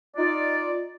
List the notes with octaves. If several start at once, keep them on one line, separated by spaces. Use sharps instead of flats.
D#4 F4 D5